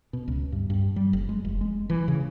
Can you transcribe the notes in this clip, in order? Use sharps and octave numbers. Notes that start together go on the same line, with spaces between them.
B2
C#2
G2
G2
G3
F#1
G#3
F1
G#3
E3
C#3